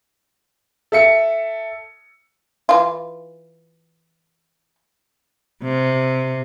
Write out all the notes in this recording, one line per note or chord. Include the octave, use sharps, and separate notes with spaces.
A4 E5 C#7
E3 F4
C3